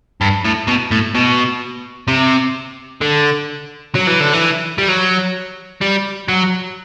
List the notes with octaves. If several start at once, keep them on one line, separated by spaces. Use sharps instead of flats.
G2
A2
B2
A2
B2
C3
D3
F#3
E3
D3
E3
G3
F#3
G3
F#3